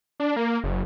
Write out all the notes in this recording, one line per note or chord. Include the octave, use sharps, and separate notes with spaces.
D4
A#3
F#1